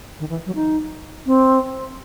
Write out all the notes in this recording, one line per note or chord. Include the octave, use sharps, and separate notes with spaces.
D#3
E3
F#3
D#4
C4